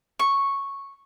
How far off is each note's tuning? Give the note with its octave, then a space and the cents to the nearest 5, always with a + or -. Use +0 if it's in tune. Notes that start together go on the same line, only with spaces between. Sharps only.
C#6 -5